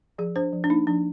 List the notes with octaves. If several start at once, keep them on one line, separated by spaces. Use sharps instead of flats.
F3 G#4
D4 C5
F3
D4
A#3 D#4
F3 D4